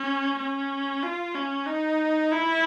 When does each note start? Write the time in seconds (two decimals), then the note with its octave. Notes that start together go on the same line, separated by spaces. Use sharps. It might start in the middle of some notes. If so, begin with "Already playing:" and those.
Already playing: C#4
0.39 C#4
1.03 F4
1.35 C#4
1.66 D#4
2.31 E4